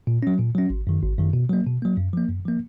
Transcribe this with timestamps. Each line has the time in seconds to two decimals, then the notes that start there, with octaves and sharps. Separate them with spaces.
0.07 A#2
0.23 F#3 C#4
0.39 A#2
0.55 F#3 C#4
0.70 G#1
0.87 F#2 D#3
1.02 G#1
1.19 F#2 D#3
1.33 B2
1.49 F#3 A#3
1.66 B2
1.82 F#3 A#3
1.97 F#2
2.13 F3 A#3
2.29 F#2
2.46 F3 A#3